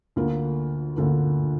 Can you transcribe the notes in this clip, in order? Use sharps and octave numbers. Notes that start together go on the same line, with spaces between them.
D2 D3 A#3 F4 A#4
D2 D3 A#3 F4 A#4